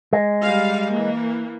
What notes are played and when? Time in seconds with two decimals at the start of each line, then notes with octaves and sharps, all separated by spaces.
0.13 G#3
0.43 G3 F5
0.94 E3 A#3